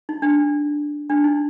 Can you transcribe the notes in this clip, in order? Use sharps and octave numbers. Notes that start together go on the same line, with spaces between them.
D#4
D4
D4
D#4